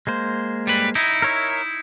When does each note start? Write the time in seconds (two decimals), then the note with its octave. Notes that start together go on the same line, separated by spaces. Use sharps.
0.07 G#3 A#3 C5
0.67 G3 B4
0.95 D#4 E4
1.22 A#4 C#5 E5